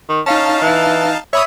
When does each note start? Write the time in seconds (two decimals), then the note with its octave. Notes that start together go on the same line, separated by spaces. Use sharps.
0.09 D#3
0.26 C#4 D#4 F5 A5
0.62 E3
1.33 C#5 E5 B5 D#6